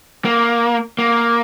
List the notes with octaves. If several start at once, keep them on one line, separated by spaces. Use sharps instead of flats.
A#3
A#3